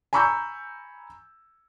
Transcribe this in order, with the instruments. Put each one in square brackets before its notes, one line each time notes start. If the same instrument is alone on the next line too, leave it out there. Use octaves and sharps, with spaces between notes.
[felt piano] G#5 A#5 B5 C#6 E6 G6